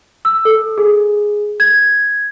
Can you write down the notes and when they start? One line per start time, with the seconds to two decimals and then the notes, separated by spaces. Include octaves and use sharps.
0.25 E6
0.45 A4
0.78 G#4
1.60 G#6